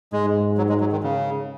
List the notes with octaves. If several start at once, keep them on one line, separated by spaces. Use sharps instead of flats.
G#2 G#3
F#3
G#3
F#3
D#3
C#3